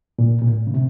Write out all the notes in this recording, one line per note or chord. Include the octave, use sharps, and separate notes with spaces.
A#2
A#2
A2
C#3
C3